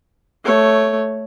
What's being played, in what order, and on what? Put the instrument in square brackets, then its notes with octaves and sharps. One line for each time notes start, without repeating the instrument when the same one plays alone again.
[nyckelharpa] A3 C#5